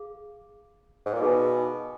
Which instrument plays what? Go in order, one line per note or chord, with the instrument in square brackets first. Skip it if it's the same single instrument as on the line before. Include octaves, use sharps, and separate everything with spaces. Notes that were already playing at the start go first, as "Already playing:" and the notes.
Already playing: [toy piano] G#4 F5
[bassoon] G#2
A#2
[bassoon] B2 [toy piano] D#4 G#4 B4 F5 G#5